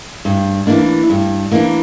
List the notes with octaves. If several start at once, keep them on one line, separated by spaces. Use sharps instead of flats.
G2
E3 A#3 D4
G2
E3 A#3 D4